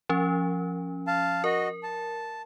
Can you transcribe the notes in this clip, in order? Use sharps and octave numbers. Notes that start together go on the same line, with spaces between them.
F3 C#4
F5 A5
F#4 A#4 D#5
A5